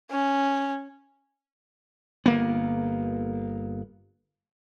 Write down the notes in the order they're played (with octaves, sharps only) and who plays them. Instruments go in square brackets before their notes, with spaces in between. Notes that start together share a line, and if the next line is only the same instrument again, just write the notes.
[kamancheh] C#4
[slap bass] G1 A#3 B3